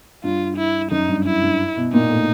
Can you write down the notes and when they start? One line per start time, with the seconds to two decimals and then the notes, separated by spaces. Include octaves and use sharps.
0.24 G2 F4
0.58 E4
0.91 F#2 D#4
1.08 G2
1.25 E4
1.42 G2
1.76 B2
1.93 A#2 D#4
2.10 A2